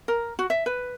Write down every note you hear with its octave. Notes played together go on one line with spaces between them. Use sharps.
A#4
F#4
E5
B4